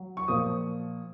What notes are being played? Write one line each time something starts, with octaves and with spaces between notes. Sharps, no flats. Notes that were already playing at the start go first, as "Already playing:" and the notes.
Already playing: F#3
C#6
A#2 F3 D#6